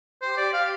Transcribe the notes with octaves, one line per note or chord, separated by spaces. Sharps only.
G4 C5
D5
F5